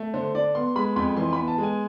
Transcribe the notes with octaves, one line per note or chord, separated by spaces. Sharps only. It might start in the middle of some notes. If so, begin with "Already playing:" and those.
Already playing: A3
D3 C5
D4 D5
B3 C6
G#3 B5
F2 B5
E3 C6
B3 B5
A5
G#3
G#5